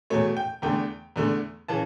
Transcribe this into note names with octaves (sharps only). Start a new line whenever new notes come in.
E2 B2 A3 C#5
G5
E2 D3 A3 G5
E2 D3 A3
C#3 E3 A5